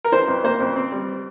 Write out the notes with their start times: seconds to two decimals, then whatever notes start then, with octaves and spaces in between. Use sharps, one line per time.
0.04 A#4
0.12 E3 C5
0.28 F2
0.44 A#3 C5
0.60 F2
0.76 C4
0.92 G3